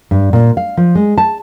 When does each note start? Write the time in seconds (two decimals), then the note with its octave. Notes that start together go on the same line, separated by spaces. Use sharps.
0.11 G2
0.33 A#2
0.57 F5
0.77 F3
0.95 G#3
1.18 A5